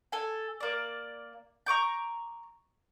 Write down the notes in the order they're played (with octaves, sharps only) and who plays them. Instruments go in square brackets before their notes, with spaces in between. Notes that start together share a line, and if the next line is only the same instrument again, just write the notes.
[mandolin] A4 G#5
A#3 D5
A#5 C#6 D6 G6